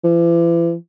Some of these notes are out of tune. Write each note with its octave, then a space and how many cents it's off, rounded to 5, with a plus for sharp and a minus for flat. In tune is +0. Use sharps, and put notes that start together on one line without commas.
E3 +40